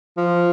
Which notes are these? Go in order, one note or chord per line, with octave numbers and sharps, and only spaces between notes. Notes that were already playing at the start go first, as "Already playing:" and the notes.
F3